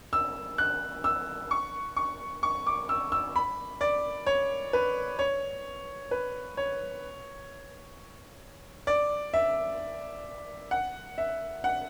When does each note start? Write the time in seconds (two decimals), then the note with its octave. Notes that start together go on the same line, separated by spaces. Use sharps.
0.13 E6
0.58 F#6
1.04 E6
1.51 C#6
1.96 C#6
2.43 C#6
2.66 D6
2.89 E6
3.12 E6
3.36 B5
3.81 D5
4.26 C#5
4.73 B4
5.19 C#5
6.11 B4
6.57 C#5
8.87 D5
9.34 E5
10.71 F#5
11.18 E5
11.64 F#5